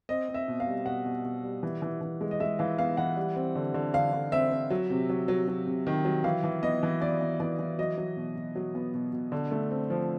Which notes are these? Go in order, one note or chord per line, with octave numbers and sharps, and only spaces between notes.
C4 D#5
C4
E5
B2
F5
G3
B2 F#5
B2
B2
G3
E3
E3
E3
G#3
D#5
G#3 E5
E3 F5
B3 F5
E3 F#5
G3
C4
D3
D3
D3 F5
D3
C4 E5
C4
F#3
C3
F#3
F#3
F#3
C3
D#3
F#3
E3 F5
E3
B3 D#5
E3
B3 D5
B3
E3 D5
E3
F#3 D#5
F#3
B2
B2
F#3
B3
B2
B2
D3
A3
C4
F3